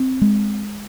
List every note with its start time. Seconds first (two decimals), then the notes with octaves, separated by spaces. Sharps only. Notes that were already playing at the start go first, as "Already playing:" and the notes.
Already playing: C4
0.21 G#3